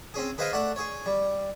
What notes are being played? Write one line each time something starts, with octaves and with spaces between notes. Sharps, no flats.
C4 C#4 G#4
G#4 B4 C5 D#5 F5 G5
A3 D5 F#5 A5
G#4 C#5
G3